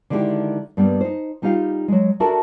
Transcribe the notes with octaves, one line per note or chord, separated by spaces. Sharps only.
D3 D#3 G#3 C4 E4 G4
G2 G3 A#3 B3
D#4 C5
G3 D#4 F4 G4 F5
F#3 G#3
D4 F#4 A4 A#4 E5 A5